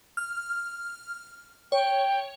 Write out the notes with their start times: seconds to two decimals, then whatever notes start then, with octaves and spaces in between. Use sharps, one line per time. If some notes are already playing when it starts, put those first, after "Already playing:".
0.17 F6
1.72 C#5 G5